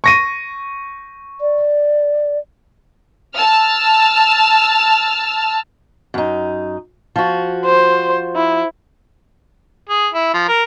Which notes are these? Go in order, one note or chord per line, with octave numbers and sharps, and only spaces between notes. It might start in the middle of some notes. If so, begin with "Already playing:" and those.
C#6 A#6 D#7
D5
A5 E6 F6
F#2 D#4
F3 F#4
C5
E4
G#4
E4
F3
A#4